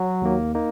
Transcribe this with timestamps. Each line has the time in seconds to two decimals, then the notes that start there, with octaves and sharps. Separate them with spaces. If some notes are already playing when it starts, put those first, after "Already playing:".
Already playing: F#3
0.22 D#2 D#3 A#3
0.55 A#3 D#4